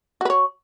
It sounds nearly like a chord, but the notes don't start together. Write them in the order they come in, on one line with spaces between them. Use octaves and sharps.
F#4 B4 C#5